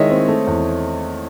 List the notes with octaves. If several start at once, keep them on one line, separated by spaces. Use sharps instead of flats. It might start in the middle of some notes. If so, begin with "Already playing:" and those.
Already playing: D#3 G#3 E4 C#5 D#5 E5
C4
A3
E2